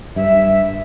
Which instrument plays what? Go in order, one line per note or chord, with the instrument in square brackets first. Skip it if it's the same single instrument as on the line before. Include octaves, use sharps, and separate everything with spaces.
[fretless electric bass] G2 [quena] E5